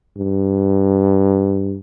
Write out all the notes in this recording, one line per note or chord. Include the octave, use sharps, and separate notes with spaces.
G2